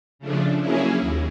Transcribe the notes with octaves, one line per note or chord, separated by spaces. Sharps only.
C#3 F3 A3 D4
F#3 A#3 C#4 E4 G#4
D#2